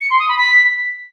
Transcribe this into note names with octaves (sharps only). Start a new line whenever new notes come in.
C#7
C6
D#6
B5
B6